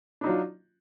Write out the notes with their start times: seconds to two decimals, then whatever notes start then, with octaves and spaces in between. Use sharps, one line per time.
0.21 D4
0.24 D#4
0.26 F#3
0.29 F4